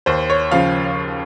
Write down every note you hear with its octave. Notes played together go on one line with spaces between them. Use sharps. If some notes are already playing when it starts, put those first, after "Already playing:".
D#2 C5
C#5
C#3 F3 F5